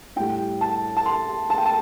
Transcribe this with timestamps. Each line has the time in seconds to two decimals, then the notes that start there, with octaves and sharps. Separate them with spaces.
0.16 A2 G3 G5
0.61 A5
0.97 A5
1.06 C6
1.50 A5
1.58 G5
1.66 A5